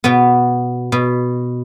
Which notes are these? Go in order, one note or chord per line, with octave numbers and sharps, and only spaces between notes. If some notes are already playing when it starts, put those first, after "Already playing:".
B2 B3
B2